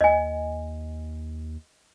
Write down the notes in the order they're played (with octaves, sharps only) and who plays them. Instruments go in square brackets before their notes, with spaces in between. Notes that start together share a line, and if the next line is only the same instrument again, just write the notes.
[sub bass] D#2 [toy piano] D#5 G#5